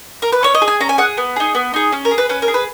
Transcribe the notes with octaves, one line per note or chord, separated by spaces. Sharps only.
A#4
B4
C#4 C#5
D#5
G#4
G#5
C#4 A#5
G#5
G#4 F#5
B3
D#4 G#4
B3
D#4 G#4
C#4
A#4
G#4
B4
C#4 B4
A#4
G#4
B4